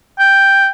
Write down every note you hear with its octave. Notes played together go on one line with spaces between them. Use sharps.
G5